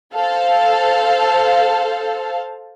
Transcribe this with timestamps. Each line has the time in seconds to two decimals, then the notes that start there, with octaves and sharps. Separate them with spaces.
0.15 A4 C5 F5 A5